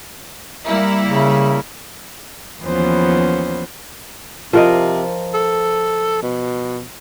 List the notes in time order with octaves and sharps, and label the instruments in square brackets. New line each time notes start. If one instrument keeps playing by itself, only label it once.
[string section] G3 A#3 E4
[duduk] C#3
[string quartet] D#2 E3 F3 B3 C#4 C5
[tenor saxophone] C3 [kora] F3 A#4 D#5
[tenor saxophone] A4
B2